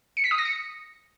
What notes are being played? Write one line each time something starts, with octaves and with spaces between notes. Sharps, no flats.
C#7
B6
D#6
A#6
C#7